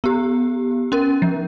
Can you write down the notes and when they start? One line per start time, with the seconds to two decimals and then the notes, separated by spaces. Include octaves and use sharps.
0.04 B3 G4
0.92 C#4 A#4
1.22 F3